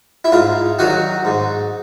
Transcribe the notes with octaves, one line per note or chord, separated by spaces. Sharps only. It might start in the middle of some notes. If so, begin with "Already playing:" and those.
E4
G#2 F4
D#3 F#3 F#4
G#2